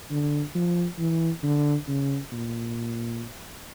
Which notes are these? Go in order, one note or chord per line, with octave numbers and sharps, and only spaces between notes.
D3
F3
E3
D3
C#3
A#2